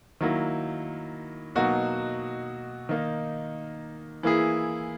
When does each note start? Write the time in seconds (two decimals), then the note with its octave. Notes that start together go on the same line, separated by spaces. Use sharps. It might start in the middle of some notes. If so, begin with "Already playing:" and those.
0.21 D#3 F#3 A#3 E4
1.55 B2 F#3 A#3 D#4 F#4
2.89 D#3 A#3 D#4
4.23 E3 A#3 E4 G#4